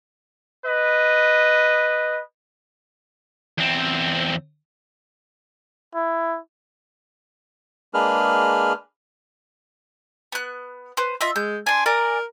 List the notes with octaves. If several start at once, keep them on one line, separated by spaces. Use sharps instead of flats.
B4 D#5
E2 C4
E4
G#3 A#3 D4 G#4 B4 F6
B3 F#6
B4 C5
F4 D#5 E5
G#3 G6
D4 G#5 C6
A#4 D5 G#5 A#5